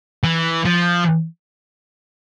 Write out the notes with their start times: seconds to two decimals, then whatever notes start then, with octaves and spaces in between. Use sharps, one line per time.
0.24 E3
0.65 F3